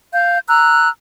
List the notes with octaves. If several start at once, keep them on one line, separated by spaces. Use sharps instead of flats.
F5 G6
A#5 E6 F#6